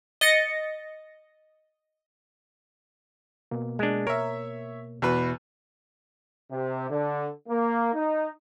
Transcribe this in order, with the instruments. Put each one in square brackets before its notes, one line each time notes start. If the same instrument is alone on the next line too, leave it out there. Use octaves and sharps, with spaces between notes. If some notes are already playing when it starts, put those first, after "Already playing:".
[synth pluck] D#5 A6 A#6 C#7
[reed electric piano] B2 A#3
[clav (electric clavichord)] G#3 D4
[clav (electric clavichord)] A#4 [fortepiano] C#5 E5
[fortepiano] E2 F#4 B4 [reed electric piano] B2 E4
[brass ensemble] C3
D3
A#3
D#4